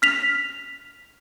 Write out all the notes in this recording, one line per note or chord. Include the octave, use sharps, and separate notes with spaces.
F6 B6 F7